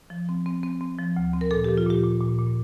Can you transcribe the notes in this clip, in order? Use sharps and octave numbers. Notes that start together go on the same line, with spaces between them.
F3
C4
C4
C4
C4
F3
D2
C4
A#4
A#2 A4
G4
F3
F4
A#2 G4
A#2
A#2
A#2